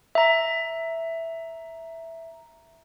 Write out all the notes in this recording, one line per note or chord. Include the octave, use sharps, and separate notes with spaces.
E5 A#5